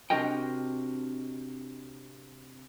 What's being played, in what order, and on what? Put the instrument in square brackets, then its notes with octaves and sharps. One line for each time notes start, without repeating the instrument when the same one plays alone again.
[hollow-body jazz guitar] C3 D4 F#4 A#4 D#5 G5